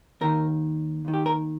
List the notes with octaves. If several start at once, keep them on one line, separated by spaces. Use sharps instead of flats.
D#2 D#3 A#4
D#2 D#3
G4
A#4